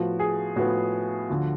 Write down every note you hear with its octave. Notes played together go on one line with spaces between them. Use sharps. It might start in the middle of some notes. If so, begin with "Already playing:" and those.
Already playing: A2 F3 B3 F#4
G#4
A2 F3 B3 F#4
D2 D3 F3